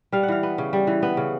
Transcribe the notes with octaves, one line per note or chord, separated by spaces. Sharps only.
G3 F5
F#5
E3 F5
B3
C#3
G3
E3
B3
C#3